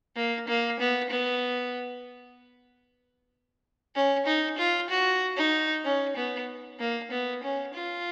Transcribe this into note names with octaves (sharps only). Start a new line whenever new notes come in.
A#3
A#3
B3
B3
C#4
D#4
F4
F#4
D#4
C#4
B3
A#3
B3
C#4
F4